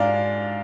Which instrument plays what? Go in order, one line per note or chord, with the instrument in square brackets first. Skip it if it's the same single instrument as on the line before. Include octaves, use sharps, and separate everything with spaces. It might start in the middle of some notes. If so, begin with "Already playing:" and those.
Already playing: [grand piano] G#2 G#3 D4 D5 F5